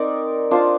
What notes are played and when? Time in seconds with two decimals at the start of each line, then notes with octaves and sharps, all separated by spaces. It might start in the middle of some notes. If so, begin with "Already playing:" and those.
Already playing: C4 D#4 A#4 D5
0.51 D4 F4 C5 F5